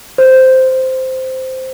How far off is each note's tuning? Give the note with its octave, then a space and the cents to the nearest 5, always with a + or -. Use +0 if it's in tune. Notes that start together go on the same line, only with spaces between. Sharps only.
C5 -10